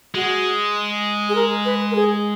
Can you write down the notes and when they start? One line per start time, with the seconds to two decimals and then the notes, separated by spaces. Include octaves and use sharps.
0.15 G#3 F#4
1.29 G#4
1.35 A#4
1.65 B4
1.91 A#4
1.95 G#4